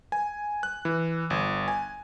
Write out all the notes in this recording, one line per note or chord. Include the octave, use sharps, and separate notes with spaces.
G#5
F#6
E3
G1
G#5